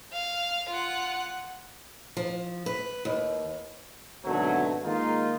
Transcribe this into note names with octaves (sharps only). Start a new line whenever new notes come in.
F5
F4 F#5
F3
B4
D#2
G#1 B2 D3 F#3 A3 C#5
D#3 G#3 A#3 D#4 F4